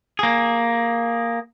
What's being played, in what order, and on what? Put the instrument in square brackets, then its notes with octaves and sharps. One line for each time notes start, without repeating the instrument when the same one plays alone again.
[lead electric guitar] A#3 G#4